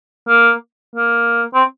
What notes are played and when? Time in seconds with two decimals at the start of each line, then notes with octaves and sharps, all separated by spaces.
0.28 A#3
0.96 A#3
1.54 C4